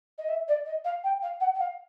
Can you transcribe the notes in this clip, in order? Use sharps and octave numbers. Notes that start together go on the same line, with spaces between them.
D#5
E5
D5
D#5
F5
G5
F5
F#5
F#5
F5